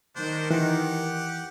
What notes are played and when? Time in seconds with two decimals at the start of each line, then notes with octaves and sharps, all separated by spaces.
0.16 D#3 D4 C5
0.51 E3 G4 F#5